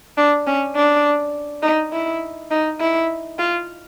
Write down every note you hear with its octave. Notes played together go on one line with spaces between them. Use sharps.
D4
C#4
D4
D#4
E4
D#4
E4
F4